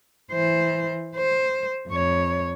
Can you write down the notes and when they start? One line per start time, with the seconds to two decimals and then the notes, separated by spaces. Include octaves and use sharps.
0.32 E3 C5
1.16 C5
1.88 F2 C#5